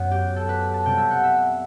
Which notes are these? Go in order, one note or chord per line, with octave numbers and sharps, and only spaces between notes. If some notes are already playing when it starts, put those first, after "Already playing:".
Already playing: F#2 F#3 B3
G4
A4
B4
A5
C3 G3 B3 G5
E5
F#5
E5